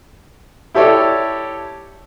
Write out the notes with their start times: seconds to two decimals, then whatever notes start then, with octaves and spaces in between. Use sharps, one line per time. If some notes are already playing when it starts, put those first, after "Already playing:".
0.74 E4 G4 A4 C#5 D5